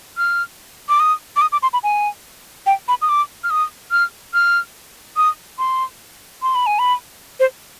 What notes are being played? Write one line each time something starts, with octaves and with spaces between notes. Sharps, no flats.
F6
D6
D#6
D6
D#6
D6
C6
B5
G#5
G5
B5
D#6
D6
F6
D#6
F6
F6
D#6
C6
C6
B5
G#5
B5
C5